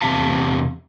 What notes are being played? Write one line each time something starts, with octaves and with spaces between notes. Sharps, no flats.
E2 C3 G4 E5 F5 A5